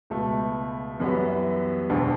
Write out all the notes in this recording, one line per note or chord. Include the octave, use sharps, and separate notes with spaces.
C#2 B2 A3
F#2 E3 G3 B3
E1 D2 D3